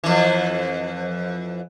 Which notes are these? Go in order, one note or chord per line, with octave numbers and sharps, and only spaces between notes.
F2 E3